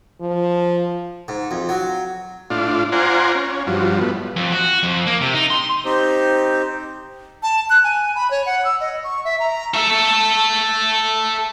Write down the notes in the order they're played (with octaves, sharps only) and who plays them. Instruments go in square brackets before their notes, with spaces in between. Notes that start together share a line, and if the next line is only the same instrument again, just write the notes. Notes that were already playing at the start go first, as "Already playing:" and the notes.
[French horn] F3
[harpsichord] G#2
F2
F#3
[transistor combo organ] A2 D4 F4
F4 C5 D5 F#5 G#5 A#5
C#4
G2 F3 F#3
A2 B3
[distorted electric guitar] F2
F#4
F2
A#3
C3
D#4
C6
[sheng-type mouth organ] C4 D#4 G4 C5
[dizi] A5
F#6
G#5
B5
C#5
F#5
E6
D#5
C#6
E5
A#5
[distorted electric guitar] A4 E5